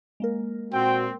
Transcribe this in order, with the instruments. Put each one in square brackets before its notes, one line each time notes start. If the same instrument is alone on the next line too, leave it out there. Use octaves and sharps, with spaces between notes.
[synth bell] G#3 A#3 A#4
[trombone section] A#2 F#4 [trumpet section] C4 [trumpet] G5